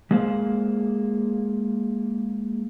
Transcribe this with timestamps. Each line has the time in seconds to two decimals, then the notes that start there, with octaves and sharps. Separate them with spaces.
0.11 G#3 A#3 G#4 C5 F5